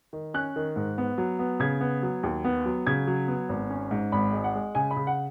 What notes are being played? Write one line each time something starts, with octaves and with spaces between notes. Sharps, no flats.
D#3
C#4 F#6
D#3
G#2
B3
F#3
B3
C#3 G#6
B3
F#3
D#2
B3
F#3
C#3 G#6
F#3
B3
G#1
C#4
G#2
G#1 B5
G#3
F#5
G#3
C#3 G#5
B5
C#3
F#5